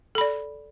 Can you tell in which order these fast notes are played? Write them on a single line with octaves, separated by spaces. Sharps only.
A4 B5 D5